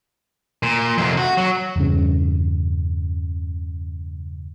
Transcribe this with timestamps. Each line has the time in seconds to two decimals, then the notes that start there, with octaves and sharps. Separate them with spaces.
0.63 A#2
0.98 F2 C3
1.17 F#4
1.37 F#3
1.76 E2 G2 C#3